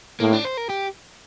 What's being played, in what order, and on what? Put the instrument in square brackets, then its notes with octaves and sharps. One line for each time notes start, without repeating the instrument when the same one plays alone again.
[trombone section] A2 [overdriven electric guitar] A#3
[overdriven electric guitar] D4
C5
A#4
G4